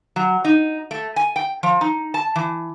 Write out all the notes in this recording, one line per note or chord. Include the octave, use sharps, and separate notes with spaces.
F#3
D#4
A3
G#5
G5
F3
D#4
A5
E3